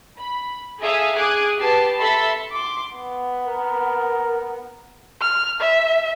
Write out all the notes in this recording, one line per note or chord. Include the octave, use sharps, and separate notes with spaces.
B5
G#4 A4 E5 F5 G#5 D#6
G#4 G#5 D6 D#6 F#6 G#6
B3 G4 G5 A5 C7
A4 E5 A5 B5 C6
C6 D6
B3
A#4
F6
E5